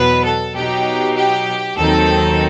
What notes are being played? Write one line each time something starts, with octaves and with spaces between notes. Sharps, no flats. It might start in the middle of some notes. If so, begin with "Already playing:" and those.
Already playing: E2 B2 F#3 B3 B4
A4
B2 F#3 B3 D#4 G4
G4
D#2 D#3 F#3 C4 D#4 A4